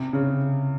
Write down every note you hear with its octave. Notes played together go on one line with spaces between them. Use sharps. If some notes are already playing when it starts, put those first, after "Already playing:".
Already playing: C3
C#3